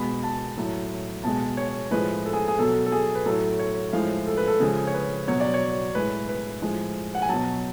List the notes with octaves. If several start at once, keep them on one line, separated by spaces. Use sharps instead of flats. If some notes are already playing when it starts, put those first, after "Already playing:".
Already playing: B2 G#3 B5
A5
A2 F#3
B2 G#3 A5
C#5
A2 F3 G#3 B4
A4
G#4
G#4
B2 F#3 A4
A4
G#4
B4
A2 F#3 A4
C#5
A2 F3 G#3 F5
A4
B4
A4
C#3 F3 G#3 G#4
C#5
B4
B2 F#3 C#5
D5
C#5
A2 G#3 B4
B4
A2 F3 G#3
F#5
G#5
B2 F#3 A5